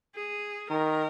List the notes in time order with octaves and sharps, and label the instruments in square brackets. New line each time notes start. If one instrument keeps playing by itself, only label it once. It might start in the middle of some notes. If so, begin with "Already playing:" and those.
[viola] G#4
[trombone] D#3 [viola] A#4